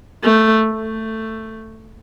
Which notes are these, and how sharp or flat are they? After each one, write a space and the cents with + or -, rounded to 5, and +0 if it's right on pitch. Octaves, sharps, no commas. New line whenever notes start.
A3 +5
A3 +10